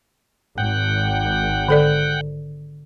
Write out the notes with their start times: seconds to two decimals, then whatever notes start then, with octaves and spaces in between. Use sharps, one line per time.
0.58 G#1 F#5 G5
1.68 D3 A4 D5